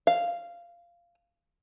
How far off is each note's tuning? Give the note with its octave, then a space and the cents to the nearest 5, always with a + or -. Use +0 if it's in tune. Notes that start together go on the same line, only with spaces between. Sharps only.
F5 -10